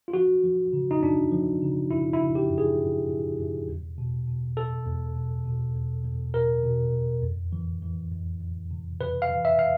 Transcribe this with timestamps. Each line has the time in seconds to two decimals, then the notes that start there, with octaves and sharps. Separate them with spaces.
0.08 F4
0.13 F3 F#4
0.43 F3
0.73 C#3
0.91 D#4
1.03 F#2 D4
1.32 F3
1.62 C#3
1.91 F#2 E4
2.13 E4
2.21 C#3
2.35 G4
2.50 F#2
2.58 G#4
2.80 F#2
3.09 F#2
3.39 F#2
3.68 E2
3.98 B2
4.28 B2
4.57 B2 A4
4.86 E2
5.16 B2
5.46 B2
5.75 E2
6.05 E2
6.34 B2 A#4
6.63 B2
6.94 E2
7.22 F2
7.53 E3
7.82 E3
8.12 F2
8.41 F2
8.71 C3
9.01 C3 B4
9.22 F5
9.30 E3
9.45 E5
9.59 F5